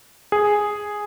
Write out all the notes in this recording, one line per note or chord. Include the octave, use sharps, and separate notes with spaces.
G#4